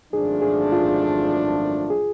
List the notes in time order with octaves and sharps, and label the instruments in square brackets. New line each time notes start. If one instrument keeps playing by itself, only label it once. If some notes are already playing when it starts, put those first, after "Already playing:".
[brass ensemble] G#1 F#2 F3 A3 D4 [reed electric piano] G#4
[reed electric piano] G#4
F4
G#4